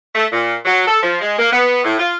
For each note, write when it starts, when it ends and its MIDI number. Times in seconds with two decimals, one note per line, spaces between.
0.15 0.26 57
0.32 0.56 46
0.65 0.85 54
0.87 1.00 69
1.03 1.19 53
1.21 1.38 56
1.39 1.48 58
1.53 1.81 59
1.84 1.97 45
1.99 2.15 65